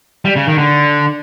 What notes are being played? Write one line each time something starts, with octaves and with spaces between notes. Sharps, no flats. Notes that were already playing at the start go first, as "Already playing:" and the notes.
G3
C#3
D#3
D3